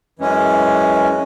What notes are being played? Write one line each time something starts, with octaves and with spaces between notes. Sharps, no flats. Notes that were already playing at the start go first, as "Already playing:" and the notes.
F#2 E3 G#3 C#4